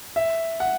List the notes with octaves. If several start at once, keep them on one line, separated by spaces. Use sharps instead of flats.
E5
F#5